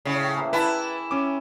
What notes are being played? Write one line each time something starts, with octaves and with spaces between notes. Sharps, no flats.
A2 C#3 G#4 C#6
A4 G5
E3 A#3 C5
E4 A#4 B4 G#5 A5 B5
C#4 D6